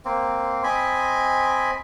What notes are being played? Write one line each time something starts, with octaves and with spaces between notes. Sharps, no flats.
A#3 C4
C4 D#5 G#5 B5